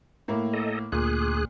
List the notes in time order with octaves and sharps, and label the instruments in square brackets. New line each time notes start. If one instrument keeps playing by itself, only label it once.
[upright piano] A2 A#3
[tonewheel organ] A4 D#5
[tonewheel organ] D2 G#4 F#6 [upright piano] A#2